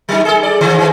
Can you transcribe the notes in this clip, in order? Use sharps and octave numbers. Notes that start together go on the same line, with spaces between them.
F#3 D#4
G#4 A4
D5
D#3 F3 A3
G#2 E3